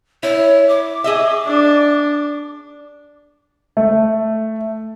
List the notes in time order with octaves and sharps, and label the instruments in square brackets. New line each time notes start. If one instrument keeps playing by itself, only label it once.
[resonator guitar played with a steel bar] E4 [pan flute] C#5
[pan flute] D6
[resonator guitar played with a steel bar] G#4 D#5 E5
[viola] D4
[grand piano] A3